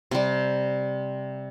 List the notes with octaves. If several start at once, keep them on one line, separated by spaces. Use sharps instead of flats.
C3 G3